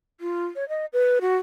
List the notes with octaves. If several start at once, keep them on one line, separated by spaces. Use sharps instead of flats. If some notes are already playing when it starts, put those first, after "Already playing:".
F4
C#5
D#5
B4
F#4